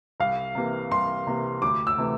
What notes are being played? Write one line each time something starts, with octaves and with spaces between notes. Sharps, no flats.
C2 F5
C3 E3 A#3
C2 C6
C3 E3 A#3
D2 D6
E6
C3 E3 A3